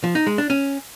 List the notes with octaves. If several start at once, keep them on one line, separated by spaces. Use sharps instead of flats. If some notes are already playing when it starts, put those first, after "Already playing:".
F3
D#4
G#3
D4
C#4